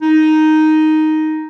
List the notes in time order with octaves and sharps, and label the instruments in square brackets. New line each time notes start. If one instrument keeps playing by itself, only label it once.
[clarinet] D#4